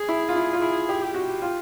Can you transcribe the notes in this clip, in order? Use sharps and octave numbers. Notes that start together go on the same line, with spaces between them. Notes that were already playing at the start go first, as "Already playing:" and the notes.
Already playing: G#4
E4
F4
E4
F4
E4 G#4
G4
G4
F#4
F4